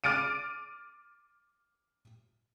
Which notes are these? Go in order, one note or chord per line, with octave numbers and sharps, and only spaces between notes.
D6 F6 A6 D7 D#7